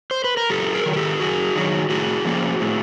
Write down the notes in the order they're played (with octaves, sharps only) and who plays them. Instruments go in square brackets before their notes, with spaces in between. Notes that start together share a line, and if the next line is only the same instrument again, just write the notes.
[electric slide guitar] C5
B4
A#4
F#2 G4 A4
G#4 A#4
D#3 F#3
A#4
G4 A4
F#2 F#4 G#4
D#3 F#3
A2 F#4 G#4
F3 A#3 C#4
A2